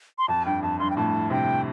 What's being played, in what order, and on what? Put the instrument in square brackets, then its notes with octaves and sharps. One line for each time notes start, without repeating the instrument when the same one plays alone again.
[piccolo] C6
[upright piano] F2 [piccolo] A5
[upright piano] G2 [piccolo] G5
[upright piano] F2 [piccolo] A5
[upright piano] G2 [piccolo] C6
[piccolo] G5
[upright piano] F2 A2 [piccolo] A5
[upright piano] G2 C3 [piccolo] G5